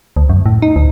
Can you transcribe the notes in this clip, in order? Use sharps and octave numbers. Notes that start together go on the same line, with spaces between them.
D2
F#2
A2
D#4
D2